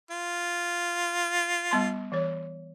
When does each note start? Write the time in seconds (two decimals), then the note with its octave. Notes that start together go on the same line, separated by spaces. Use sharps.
0.10 F4
1.71 G3 B3 C6
2.12 E3 C#5